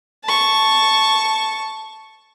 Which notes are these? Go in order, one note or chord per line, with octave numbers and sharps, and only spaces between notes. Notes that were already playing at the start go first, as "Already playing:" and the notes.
A5 C#6